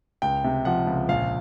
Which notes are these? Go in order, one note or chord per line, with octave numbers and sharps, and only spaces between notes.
C#2 G5
C3
F3 F#5
C#2
A#1 F5